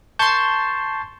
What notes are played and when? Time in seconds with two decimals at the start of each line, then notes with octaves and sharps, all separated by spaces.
0.19 A5 C6 C#6 G6